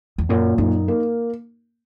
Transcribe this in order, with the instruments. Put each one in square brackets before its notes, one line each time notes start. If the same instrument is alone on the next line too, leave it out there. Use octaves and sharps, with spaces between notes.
[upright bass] E2
[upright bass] F#2 [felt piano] A#2
[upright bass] F#2 [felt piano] D#4
[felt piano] A#3